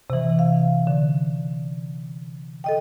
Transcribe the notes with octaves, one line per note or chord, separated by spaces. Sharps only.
C3 E3
F5
D3
A4 D#5 G5